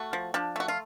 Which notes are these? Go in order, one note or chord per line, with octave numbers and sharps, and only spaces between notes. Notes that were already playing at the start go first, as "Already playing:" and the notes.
Already playing: A3 F#4
F3
F3 D4
A3 F#4
F4